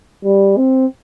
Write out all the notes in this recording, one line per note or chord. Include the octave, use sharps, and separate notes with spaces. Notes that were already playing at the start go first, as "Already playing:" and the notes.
G3
C4